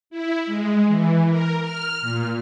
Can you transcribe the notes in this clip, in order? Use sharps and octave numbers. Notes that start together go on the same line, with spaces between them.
E4
G#3
E3
A#4
F6
A#2